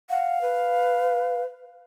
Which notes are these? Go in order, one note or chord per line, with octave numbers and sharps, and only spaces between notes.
F5 F#5
B4